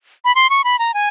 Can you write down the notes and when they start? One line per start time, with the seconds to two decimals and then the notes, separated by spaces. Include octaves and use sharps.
0.25 B5
0.35 C6
0.50 C#6
0.64 B5
0.79 A#5
0.94 G#5